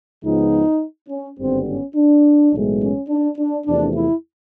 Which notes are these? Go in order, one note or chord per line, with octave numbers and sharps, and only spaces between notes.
C#2 C#3 F3 G#3 B3 D#4
C#4
G#1 G2 D3 G3 B3 C4
C#4
D4
B1 A2 E3 G#3 B3
C#4
D4
D4
E2 C3 F3 A3 D4
E4